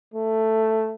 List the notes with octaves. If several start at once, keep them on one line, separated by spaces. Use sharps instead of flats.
A3